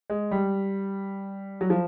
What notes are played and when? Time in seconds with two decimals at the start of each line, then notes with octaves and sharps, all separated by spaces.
0.10 G#3
0.31 G3
1.61 F#3
1.70 F3